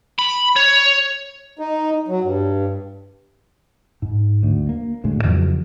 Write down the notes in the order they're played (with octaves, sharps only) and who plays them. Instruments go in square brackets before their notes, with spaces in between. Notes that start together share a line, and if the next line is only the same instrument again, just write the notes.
[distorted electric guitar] B5
C#5
[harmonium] D#4
F#3
G2
[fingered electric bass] G#2
D2
A#3
D2 A2 G#3
F2 C#3 E3 F#3